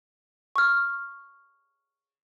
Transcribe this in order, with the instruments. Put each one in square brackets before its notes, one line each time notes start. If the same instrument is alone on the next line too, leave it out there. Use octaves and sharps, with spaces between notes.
[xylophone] C#6 F6